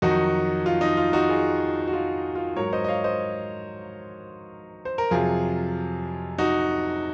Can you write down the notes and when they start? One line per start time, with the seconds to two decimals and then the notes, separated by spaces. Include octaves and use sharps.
0.02 F2 D#3 F#3 D#4 F#4
0.66 F4
0.81 D#4
0.97 F4
1.13 D#4 F#4
1.29 F4 G#4
1.88 F#4
1.93 F4
2.35 F4
2.56 G#2 F#3 A#4 C#5
2.73 C5 D#5
2.84 D#5
2.88 C#5 F5
3.04 C5 D#5
4.85 C5
4.98 A#4
5.11 F2 C3 F#3 F4 G#4
6.38 D#4 F#4